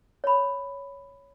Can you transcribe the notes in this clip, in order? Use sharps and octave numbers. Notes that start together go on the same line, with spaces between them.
C#5 B5